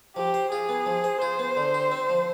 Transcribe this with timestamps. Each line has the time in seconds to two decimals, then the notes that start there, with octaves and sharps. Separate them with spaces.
0.16 F3 G4
0.34 C5
0.51 F4 G#4
0.69 B3
0.86 F3
1.04 C5
1.21 F4 C5
1.39 B3
1.57 D3
1.74 G4
1.92 C4
2.10 F3